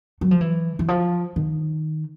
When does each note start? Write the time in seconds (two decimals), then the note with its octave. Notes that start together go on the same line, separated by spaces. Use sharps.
0.21 F#3
0.31 F3
0.41 E3
0.79 E3
0.88 F3
1.36 D#3